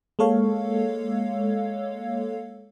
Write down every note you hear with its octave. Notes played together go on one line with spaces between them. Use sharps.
G#3 A#3 A4 C#5 F5